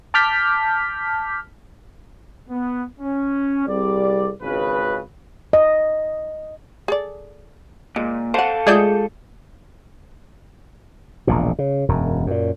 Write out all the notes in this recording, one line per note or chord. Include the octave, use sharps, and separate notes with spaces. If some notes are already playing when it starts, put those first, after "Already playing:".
A5 D6 F6 G6 B6
B3
C#4
C2 C3 G3 G#4 D5
G#1 C#2 C#3 B4
D#5
G#4 A4 D5
A#2 G#3
A4 C5 F5 F#5 A5
G#3 A3 F4 G#4 D5 D#5 G6
E1 A#1 A#2
C#3
E1 F#2
F#2 A#2